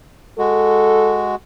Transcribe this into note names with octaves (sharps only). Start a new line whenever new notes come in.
G#3 F#4 A4